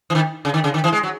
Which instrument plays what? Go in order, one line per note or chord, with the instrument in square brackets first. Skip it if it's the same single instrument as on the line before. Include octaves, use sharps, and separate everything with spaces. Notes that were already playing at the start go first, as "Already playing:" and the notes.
[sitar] E3
D#3
C#3
D#3
C#3
D#3
E3
G#3
F#3